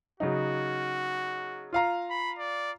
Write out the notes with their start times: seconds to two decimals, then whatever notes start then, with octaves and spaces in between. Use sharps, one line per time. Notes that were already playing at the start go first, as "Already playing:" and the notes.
0.20 C#3 F#3 D#4 F#4
1.73 F4 F5 A#5
2.10 B5
2.39 D5